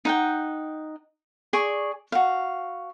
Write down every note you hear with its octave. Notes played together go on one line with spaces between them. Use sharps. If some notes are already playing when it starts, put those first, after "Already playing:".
D#4 F#5 G5
G#4 D5 C#6
F#4 F5